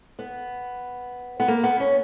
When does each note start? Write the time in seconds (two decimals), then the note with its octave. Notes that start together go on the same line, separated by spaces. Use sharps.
0.19 B3
1.40 B3
1.48 A#3
1.64 B3
1.80 C#4